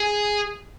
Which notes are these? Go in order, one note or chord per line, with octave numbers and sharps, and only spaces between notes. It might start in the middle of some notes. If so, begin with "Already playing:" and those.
Already playing: G#4